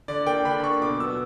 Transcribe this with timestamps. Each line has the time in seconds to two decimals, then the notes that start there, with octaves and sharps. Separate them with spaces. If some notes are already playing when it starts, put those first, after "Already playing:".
0.08 D3 D5
0.27 A#3 G5
0.45 D3 B5
0.64 A#3 C#6
0.82 B2 D6
1.00 F#3 B3 E6